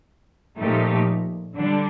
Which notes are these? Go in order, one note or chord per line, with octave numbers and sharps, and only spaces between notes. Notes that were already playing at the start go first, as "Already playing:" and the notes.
A#2 F3 A3 D#4 G4
D3 G3 D4